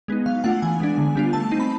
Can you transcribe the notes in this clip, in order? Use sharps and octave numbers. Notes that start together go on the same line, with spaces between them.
G#3 B3 D#4
F#3 F5
A3 D4 F4 F#5
E3 G#5
G#3 B3 D4
D3
G3 B3 D4 F4
A3 A5
C4 D#4
B5